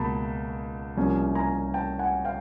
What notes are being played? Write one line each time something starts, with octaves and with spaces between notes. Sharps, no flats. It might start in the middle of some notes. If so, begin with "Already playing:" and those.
Already playing: C#2 B2 F#3 A#3 A5 B5
C2 C3 F3 A#3 C#4
G#5 A#5
G5 A5
F#5 G#5
F5 G5